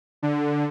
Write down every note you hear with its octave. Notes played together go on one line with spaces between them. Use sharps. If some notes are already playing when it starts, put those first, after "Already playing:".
D3